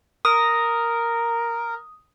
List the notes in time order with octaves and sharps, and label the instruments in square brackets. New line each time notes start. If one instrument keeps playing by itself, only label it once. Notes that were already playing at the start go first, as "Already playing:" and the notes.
[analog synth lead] A#4 [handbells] D#6